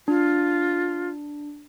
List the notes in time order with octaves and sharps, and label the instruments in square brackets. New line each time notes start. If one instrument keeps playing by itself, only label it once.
[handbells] D4 [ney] F4